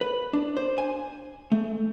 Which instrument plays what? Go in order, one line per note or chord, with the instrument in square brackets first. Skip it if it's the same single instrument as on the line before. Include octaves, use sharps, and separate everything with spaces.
[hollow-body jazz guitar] B4
D4
C5
G#5
A3